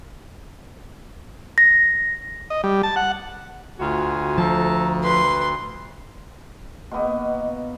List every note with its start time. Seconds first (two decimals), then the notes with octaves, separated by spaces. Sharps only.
1.58 A#6
2.50 D#5
2.64 G3
2.83 A5
2.96 F#5
3.79 D2 F4 F#4 G#5
4.38 F3 A4 A5 A#5
5.04 B4 C6
6.91 B2 A#3 B3 D#5